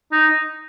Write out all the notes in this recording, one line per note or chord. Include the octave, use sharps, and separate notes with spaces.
D#4